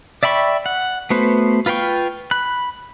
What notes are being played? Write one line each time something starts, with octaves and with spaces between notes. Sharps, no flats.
D5 E5 G5 B5 C#6
F#5
A3 B3 F#4 B4 C5
F4 B4 F5 G5 C#6
B5 F#6